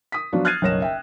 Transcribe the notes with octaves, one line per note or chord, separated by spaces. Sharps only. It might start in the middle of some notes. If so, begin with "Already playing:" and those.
D#6 B6
F3 F#3 B3 D4 F4 F#4
F6 F#6 G#6 A6 C7 D#7
F#1 B1 C#5 A#6 E7
E5 G5